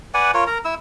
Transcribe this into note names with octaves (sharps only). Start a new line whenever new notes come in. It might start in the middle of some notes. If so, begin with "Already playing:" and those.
B4 D5 F#5 G#5
F4 A#4 C#5
A#4 A#5
E4 E6